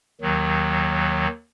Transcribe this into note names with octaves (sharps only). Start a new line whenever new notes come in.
D#2 D#3 F#3